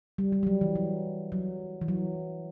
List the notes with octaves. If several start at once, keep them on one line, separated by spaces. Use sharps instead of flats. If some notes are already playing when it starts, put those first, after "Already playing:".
G3
G3
G3
F#3
E3
F#3
F#3
E3
F#3